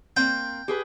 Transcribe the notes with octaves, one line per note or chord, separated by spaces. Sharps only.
A#3 C4 G5
G4 G#4 B4